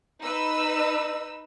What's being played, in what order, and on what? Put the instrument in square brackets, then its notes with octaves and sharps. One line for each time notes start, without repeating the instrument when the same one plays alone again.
[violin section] D#4 B4 E6